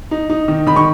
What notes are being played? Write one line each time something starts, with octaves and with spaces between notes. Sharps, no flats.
D#4
D#4
D#3
D#3 B5
C#6